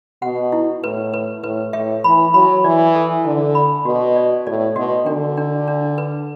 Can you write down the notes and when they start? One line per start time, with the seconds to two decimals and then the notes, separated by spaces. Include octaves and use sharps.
0.22 B2 F#5
0.52 E4
0.83 A2 B4
1.14 B4
1.44 A2 B4
1.73 A2 E5
2.04 E3 B5
2.34 F#3 B5
2.64 E3 D5
2.95 A4
3.24 D3 E4
3.55 B5
3.85 B2 F#4
4.16 D5
4.47 A2 D5
4.76 B2 F#4
5.06 D3 D4
5.37 D4
5.68 D4
5.98 B4